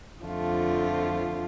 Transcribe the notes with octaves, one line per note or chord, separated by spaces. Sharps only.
F2 D3 F3 A3 F4